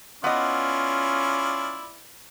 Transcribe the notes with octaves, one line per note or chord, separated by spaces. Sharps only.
B3 C#4 E4 F4 D5 D#5